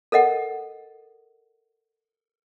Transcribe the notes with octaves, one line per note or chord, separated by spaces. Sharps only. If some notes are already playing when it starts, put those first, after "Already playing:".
A4 A#4 D#5 F#5